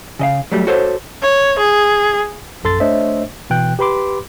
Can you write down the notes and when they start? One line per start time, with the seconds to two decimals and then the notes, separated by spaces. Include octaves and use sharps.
0.19 C#3 D#5 F5
0.52 F#3 G3 A3
0.67 F#4 A4 C5 C#5
1.22 C#5
1.59 G#4
2.63 A#1 F#2 A4 C6 A6
2.80 A3 D4 C5 C#5 D#5 E5
3.50 B2 E3 G5 F#6
3.79 G4 B4 B5 C6 D6